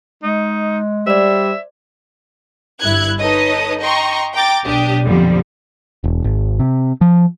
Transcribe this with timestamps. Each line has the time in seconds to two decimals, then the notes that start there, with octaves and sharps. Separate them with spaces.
0.23 G#3 D#4
1.07 G3 C5 D5 E5
2.81 G1 G2 E4 F#6 G#6
3.19 D#4 A4 B4 C#5 D#5 D#6
3.82 D#5 G5 A#5 C6 C#6
4.34 G5 A#5 D6 A6
4.64 B1 D4 G4 D#6
5.04 B1 F2 A#2 D3 F3 G3
6.04 E1
6.24 G#1
6.59 C3
7.01 F3